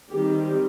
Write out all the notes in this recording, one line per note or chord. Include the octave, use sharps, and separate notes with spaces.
D#3 G3 C4 G4